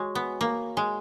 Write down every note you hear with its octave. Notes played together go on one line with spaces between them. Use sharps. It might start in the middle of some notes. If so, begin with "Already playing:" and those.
Already playing: G#3 F#4 C#5 G#5 C#6
B3
A#3
G#3